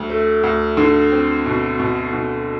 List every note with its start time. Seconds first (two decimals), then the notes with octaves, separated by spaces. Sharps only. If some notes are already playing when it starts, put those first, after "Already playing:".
Already playing: D2
0.10 A3
0.43 D2
0.77 D3
1.12 C4
1.46 B2
1.79 B2
2.13 B2